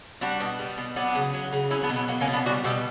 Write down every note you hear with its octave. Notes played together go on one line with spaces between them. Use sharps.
G3 D4 F#4
B2
G3
B2
F#3 B3 D4
C#3
F#3
C#3
F#3 C#4 E4
B3 D4
B2
B3
F#3 A#3
A#3 C#4
B2
B3 D4
G3 D4 F#4
B2 E4 G4